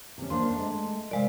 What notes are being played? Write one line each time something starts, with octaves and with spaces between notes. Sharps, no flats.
C3 C#4
A#3 D4 C5 C6
G#3 A3
C3 G#3 A#4 D5 F5